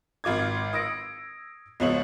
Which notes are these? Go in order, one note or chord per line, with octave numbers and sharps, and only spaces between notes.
G#1 F4 D6 G#6
D#6 E6 A#6 C#7 D7
C#2 B2 F3 C#5 C#7 F#7